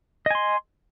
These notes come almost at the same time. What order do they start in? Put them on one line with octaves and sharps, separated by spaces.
D#5 G#5 C6